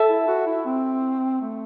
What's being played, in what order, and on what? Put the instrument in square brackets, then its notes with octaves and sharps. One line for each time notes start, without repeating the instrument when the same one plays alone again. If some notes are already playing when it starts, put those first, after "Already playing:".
Already playing: [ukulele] A4 E5 A5
[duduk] E4
F#4
E4
C4
A3